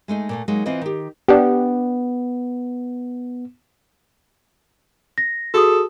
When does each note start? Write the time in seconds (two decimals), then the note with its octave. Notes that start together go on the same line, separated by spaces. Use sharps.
0.08 G#3 A3 D#4 G#4
0.29 A#2 A3 A#3
0.48 F#3 G#3 A#3 D#4
0.66 E3 C4 F4 B4 D#5
0.81 D#3 G4
1.28 B3 D4 G4
5.18 A#6
5.54 F#4 G#4 A4 D#6